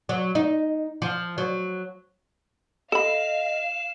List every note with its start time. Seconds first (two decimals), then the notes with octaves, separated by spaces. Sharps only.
0.09 F#3
0.35 D#4
1.02 F3
1.38 F#3
2.92 A4 D#5 F5 B5 E7